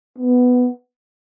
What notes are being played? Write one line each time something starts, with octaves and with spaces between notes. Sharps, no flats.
B3